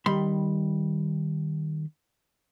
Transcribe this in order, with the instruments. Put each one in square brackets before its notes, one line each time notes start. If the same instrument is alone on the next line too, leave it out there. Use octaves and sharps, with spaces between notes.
[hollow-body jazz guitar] D#3 G3 B5 C6